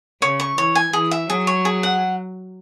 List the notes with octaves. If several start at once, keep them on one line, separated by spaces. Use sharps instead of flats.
C#3 C#5
C#6
E3 C#5
G#5
E3 G#4
E5
F#3 G#4
C#5
G#4
F#5